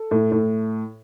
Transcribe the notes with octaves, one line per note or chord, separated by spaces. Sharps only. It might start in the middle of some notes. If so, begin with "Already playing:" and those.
Already playing: A4
A2
A2